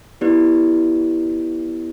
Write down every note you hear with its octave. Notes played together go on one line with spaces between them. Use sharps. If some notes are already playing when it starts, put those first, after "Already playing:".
B3 E4 G4 B4 D5